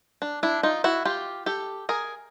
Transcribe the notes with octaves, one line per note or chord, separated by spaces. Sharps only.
D4
D4 E4
D#4 F4
E4 F#4
F4 G4
G4 A4
G#4 A#4